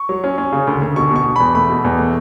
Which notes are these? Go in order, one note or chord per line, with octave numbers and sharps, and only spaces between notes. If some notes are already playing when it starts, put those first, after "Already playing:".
Already playing: C#6
F#3
C#4
C#4
C#3
D2
D2
B2 C#6
B2 C#6
B2
E2 B5
A3 B5
B2
E2
A3